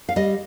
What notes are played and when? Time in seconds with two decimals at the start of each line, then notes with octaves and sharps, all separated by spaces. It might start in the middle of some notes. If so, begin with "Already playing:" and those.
0.09 F5
0.16 G3 D#5